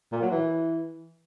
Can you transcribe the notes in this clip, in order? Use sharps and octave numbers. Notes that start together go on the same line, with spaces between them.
A#2
F#3
E3